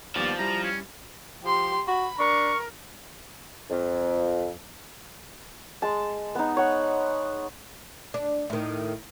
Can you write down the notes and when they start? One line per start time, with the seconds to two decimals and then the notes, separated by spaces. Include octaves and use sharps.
0.16 D#2 F3 G3 B3 D5
0.39 G3 E4 A#5
0.63 C#4
1.43 F3 G4 C6
1.88 F#4 B5
2.19 D4 A#4 C#6
3.70 F2
5.82 G#3 A5
6.35 B3 D#4
6.57 C#5 F#5
8.14 D4
8.50 A2 D#3